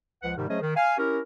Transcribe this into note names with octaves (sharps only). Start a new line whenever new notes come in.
C#2 F3 B4 F#5
G#2 C3 D#3 G3
F#3 A3 C#4 G#4 C5 D#5
D#3
F5 G#5
C#4 E4 G4 A#4